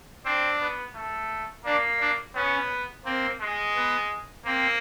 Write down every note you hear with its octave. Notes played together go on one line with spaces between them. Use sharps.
C4 D4
B3
A3
A#3 D4
D4
B3 C#4
A#3 C4
G#3
B3
A#3 C4